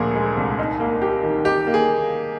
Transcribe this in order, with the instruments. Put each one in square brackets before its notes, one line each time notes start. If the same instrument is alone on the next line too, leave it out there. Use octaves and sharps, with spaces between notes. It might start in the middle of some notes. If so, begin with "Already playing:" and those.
Already playing: [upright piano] D2 A#2 F3 [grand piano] G#4 A#4
[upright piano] G#3
C2
D#4
A#3
G4
D#3
[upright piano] D#4 [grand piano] G4
[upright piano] A#3
[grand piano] G#4